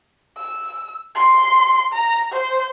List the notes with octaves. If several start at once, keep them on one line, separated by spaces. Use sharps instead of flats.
E6
C6
A#5
C5